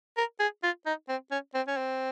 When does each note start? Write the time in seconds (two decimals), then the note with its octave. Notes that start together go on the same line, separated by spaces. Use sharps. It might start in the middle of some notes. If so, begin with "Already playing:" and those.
0.17 A#4
0.40 G#4
0.63 F4
0.86 D#4
1.09 C4
1.31 C#4
1.54 C4
1.68 C#4
1.77 C4